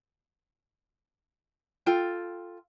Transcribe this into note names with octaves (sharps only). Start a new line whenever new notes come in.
F4 A4 G5